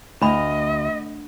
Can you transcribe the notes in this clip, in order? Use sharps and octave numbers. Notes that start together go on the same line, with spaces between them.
D2 D4 D#5 B5